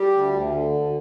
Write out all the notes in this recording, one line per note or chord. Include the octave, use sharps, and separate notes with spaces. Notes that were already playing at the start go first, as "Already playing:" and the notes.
Already playing: G3 G4
D2
D2
D3
D2